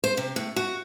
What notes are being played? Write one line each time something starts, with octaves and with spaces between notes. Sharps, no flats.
C5
C3
A2
F#4